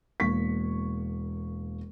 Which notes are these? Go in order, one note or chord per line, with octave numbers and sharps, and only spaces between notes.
E1 A#3 C#6 B6